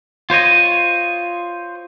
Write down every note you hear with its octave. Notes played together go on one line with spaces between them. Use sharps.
F4 C5 C#5 D#5